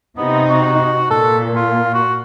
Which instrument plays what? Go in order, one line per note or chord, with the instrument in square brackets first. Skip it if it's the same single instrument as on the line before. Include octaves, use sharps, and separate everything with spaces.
[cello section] C3 D#4 [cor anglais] B3
[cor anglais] F#4
[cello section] A#2 [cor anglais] A4
[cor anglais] F4
F#4